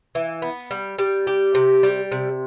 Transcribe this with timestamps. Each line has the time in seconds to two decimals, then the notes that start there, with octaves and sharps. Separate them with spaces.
0.15 E3
0.42 B3
0.71 G3
0.99 G3
1.27 G4
1.55 C3
1.83 G3
2.12 C3